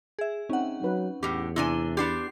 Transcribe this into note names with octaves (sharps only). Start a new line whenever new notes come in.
G#4 E5
C4 C#4 D#4 F#5
F#3 D#4 B4
E2 A2 G4
C3 D4 E4 G#5 G7
B3 D4 G4 C6 C7